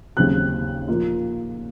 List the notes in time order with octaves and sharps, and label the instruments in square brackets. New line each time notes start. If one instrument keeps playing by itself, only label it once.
[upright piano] D#2 C#3 F#3 C4 D#4 F#6
A#2 F3 A#3 F4